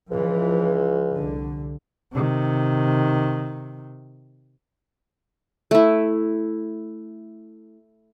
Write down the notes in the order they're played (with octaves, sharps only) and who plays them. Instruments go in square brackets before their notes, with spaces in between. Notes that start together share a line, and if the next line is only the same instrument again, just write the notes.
[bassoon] C#2 [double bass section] E3 F3
[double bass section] C2 D3
[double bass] C3 D#3
[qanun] A3 E4